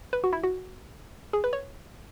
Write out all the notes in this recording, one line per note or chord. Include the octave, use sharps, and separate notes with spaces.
B4
F#4
E4
F#4
G#4
B4
C#5